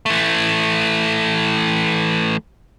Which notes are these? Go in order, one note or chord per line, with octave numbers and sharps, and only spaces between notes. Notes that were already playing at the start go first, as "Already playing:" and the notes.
E3 A3